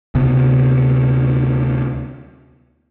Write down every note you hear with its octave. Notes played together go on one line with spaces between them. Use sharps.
D2 C3 B3